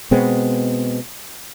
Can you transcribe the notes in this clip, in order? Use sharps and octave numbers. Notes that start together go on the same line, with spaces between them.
B2 G#3 B3 C4